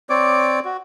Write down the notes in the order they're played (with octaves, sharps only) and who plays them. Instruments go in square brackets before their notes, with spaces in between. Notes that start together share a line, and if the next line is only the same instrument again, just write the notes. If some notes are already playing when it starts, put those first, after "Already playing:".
[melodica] C4 C#5 D5 D6
F#4